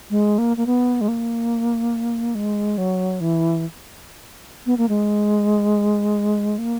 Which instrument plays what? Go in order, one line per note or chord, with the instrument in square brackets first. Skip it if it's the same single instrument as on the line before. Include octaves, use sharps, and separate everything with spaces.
[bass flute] G#3
A#3
A#3
B3
G#3
A#3
G#3
F#3
E3
B3
A#3
G#3
A#3